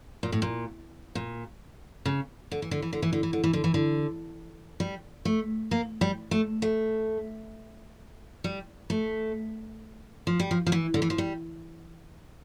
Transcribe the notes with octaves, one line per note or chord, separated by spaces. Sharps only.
A#2
A2
A#2
A#2
C#3
D3
E3
D3
E3
D3
E3
D3
E3
D3
E3
D3
E3
D3
G3
A3
A#3
G3
A3
A3
G3
A3
F3
G3
F3
F3
E3
D3
E3
F3
G3